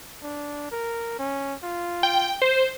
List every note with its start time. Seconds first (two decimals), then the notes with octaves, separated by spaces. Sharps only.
0.23 D4
0.72 A#4
1.19 C#4
1.63 F4
2.03 G5
2.42 C5